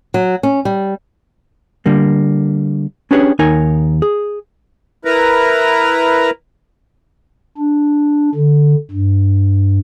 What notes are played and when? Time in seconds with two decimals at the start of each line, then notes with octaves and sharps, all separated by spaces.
0.14 F#3
0.43 C#4
0.65 G3
1.86 D3 G3 A#3
3.11 C#4 D4 G4 G#4 B4 C#5
3.39 D#2 D#4 A#4 C#5 G#5
4.02 G#4
5.05 E4 A#4 B4 A#5
7.58 D4
8.35 D3
8.91 G2